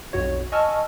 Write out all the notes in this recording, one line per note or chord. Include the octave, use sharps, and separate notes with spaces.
B1 F2 F#4 C#5
D#5 G#5 A5 C#6 E6 F6